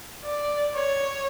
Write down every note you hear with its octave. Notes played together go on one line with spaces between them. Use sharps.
D5
C#5